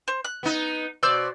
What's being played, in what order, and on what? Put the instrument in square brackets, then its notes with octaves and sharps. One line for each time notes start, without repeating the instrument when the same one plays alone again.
[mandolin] C5
F#6
[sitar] B3 D#4
[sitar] B2 D5 [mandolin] C5 E6 G6